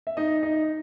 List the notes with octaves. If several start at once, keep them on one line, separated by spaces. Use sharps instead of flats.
E5
D#4 D#5
D#4 D#5